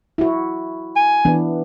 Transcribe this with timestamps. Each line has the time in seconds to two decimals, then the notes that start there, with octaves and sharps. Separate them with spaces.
0.18 E4 F#4
0.96 G#5
1.25 E3 B3 D4